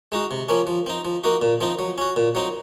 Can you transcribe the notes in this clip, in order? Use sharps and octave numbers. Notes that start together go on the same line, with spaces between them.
G#3 D#4 F#4
C3
F3 A#3 C#4
F3
C4 D#4
F3
A#3 D#4 F#4
A#2
F3 C4 D#4
F#3
C#4 F#4
A#2
F#3 C4 D#4